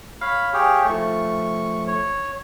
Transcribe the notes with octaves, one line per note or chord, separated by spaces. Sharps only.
C#5 F5 B5
G4 G#4 C#5
F3 A3 C#6
C#5